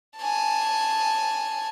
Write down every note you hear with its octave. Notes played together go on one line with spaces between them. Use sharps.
G#5 A5